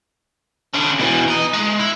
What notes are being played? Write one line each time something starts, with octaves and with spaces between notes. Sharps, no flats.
D3 C#4
B2 E3
D#5 A#5
G#3
E4